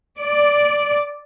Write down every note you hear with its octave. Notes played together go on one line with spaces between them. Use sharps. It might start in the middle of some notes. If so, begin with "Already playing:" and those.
D5